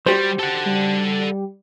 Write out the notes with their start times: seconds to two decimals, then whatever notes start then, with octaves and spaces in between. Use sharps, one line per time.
0.06 G3 F#4 G4 C5
0.39 A4 F#5
0.66 G3